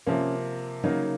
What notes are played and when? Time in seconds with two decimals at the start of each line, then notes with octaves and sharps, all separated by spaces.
0.07 C3 F3 A#3 C#4
0.84 C#3 F#3 A#3 D#4